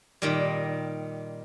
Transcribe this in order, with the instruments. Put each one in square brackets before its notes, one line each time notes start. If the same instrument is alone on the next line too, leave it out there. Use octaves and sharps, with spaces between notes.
[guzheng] A#2 D#3 G3